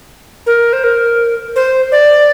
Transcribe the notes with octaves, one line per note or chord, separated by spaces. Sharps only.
A#4
C5
A#4
C5
D5